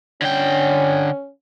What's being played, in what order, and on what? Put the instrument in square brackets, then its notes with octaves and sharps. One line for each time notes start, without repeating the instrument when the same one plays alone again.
[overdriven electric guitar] D3 G5 [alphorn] C#4